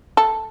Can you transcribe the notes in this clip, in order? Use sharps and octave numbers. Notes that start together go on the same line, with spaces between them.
A4